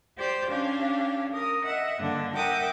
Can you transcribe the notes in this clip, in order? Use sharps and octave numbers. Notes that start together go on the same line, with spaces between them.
G4 C5 D5 G6
C#4 D4 G4 F5
A#4 D#6
D#5 E5 F#5
G2 D3 A#3 D4
A#4 E5 F#5 G5 D6 D#6